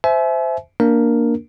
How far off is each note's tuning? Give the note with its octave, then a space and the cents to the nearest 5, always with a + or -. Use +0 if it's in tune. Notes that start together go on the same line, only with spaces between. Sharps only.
C5 -15 E5 +0 G#5 +40
A#3 +0 D4 +0 A#4 +0